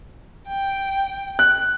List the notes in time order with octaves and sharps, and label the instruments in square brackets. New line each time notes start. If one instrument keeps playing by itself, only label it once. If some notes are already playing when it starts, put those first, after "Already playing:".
[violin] G5
[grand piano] F#6